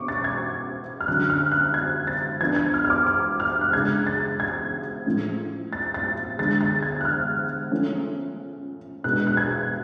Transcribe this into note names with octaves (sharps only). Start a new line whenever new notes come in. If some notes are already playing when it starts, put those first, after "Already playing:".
Already playing: B2 C#4 C#6 D6
A6
G#6
F6
D3 F#3 C#4 F#6
F6
F#6
G#6
A6
F3 B3 D4 G#6
G#6
F6
F6
D6
D6
F6
F#6
C#3 G#3 D4 G#6
A6
G#6
A2 F3 A3 C#4
A6
A6
D3 G#3 D4 A6
A6
G#6
F#6
F6
F3 A3 C#4
B2 G#3 D4 F#6
F#6
G#6